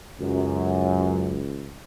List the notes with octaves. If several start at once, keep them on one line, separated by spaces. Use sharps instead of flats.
C#2 F#2